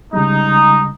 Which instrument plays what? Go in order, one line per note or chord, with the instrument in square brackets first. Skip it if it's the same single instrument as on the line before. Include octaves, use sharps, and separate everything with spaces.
[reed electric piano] C#3 G3 G#3 [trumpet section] D#4